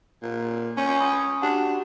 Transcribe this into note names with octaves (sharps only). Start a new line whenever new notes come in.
A#2
C#4 G#5 G6 G#6
B5 C6 D#6
D4 F#4 G4 F#5